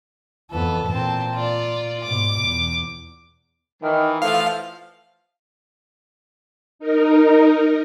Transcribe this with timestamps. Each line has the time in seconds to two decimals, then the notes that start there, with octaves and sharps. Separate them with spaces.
0.51 F2 E3 B3 A4
0.87 A#2 C4 A5
1.35 F4 D5
2.04 G#2 B2 D6
2.42 E2
3.83 D#3 E3
4.22 E3 F3 A3 F5
6.79 D#4 A#4